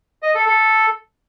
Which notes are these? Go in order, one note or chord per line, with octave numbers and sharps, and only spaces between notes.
D#5
A4
A4